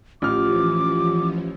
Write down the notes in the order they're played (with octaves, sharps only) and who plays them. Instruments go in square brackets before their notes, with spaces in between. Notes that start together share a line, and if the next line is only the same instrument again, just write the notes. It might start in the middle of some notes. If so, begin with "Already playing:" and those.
[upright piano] A1 F6 [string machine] E3 F3 C#4 [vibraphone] F4 G4 [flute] D6